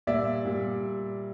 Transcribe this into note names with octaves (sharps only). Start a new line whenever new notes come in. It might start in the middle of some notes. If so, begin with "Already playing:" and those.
A#2 G3 D5 E5
A#2 G3